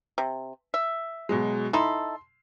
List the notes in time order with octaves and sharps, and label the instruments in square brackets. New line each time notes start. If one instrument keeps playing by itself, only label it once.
[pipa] C3
E5
[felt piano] B2 F#3 G#3
[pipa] D#4 E4 A4 [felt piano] C6